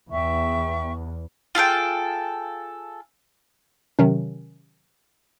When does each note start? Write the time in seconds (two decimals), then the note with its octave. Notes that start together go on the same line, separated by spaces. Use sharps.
0.10 E2 E5 G5 C#6
1.55 F4 G#4 A4 G5
3.99 C3 D#3 F#3 C#4